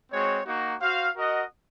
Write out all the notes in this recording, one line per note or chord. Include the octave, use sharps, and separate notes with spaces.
G#3 C4 F#4 C#5
A#3 D#4 F#4
F#4 C5 F5
F#4 A#4 D#5 F#5